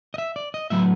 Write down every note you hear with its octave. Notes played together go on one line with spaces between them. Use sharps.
D#5
E5
D5
D#5
A2 F#3 B3 E5